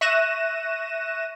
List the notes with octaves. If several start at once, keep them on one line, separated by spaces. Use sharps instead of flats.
E5 C#6 F#6 A#6 D#7 E7